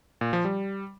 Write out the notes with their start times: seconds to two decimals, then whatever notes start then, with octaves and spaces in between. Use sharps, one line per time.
0.21 A#2
0.33 F3
0.45 G3